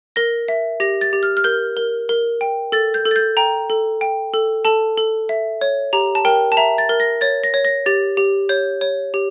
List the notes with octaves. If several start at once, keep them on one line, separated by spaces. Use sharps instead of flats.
A#4 A#6
E5
G4 A#6
A6
G4
F6
F6
A#4 G6
A#4
A#4
G5
A4 A6
G6
A4
A6
G6
G5 A#5
A4
G5
A4
A4 A5
A4
E5
C#5
G4 A#5
A5
A#4 G5
A5
E5 A#5
A6
A#4
A#6
C#5 A6
A#6
C#5
A#6
G4 A6
G4
C#5 G6
C#5
G4